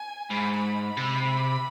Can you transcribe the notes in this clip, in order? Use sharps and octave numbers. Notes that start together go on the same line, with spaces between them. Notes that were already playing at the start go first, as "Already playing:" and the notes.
Already playing: G#5
G#2 B5
B5
C3